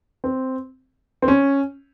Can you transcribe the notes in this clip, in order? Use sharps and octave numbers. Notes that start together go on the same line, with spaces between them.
C4
C4
C#4